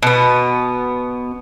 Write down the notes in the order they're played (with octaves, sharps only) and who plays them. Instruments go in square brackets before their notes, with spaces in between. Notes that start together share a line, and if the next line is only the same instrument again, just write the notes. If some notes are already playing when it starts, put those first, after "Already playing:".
[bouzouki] B2 B3